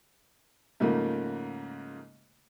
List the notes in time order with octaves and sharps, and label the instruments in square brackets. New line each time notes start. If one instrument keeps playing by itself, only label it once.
[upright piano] G#2 C#3 F3 A3 A#3